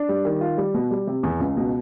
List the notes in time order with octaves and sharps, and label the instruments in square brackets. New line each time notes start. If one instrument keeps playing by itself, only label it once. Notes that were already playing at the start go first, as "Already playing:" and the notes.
Already playing: [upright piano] D4
G3
D#3
F4
G3
B2
G3
C3
E2
C#2
B2